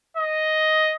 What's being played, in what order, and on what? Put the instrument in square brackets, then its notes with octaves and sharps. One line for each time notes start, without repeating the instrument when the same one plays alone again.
[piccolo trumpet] D#5